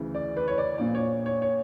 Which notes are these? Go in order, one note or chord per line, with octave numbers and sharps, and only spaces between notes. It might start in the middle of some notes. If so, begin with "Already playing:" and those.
Already playing: D2 C#3 E3
D5
B4
C#5
D5
A#1 A#2 D5
C#5
C#5
C#5